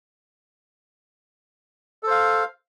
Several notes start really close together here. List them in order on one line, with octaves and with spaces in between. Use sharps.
A4 C5 F5